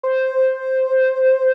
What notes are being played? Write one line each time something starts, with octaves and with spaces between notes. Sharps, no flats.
C5